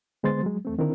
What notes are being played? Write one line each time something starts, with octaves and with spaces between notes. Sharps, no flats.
D3 G#3 B3 C5 C6 A6
F#3 G#3
E2 A3 C4
D3 D#3 C4 D4 E4 A#4